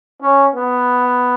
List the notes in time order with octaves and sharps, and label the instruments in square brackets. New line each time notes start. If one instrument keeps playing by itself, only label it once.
[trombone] C#4
B3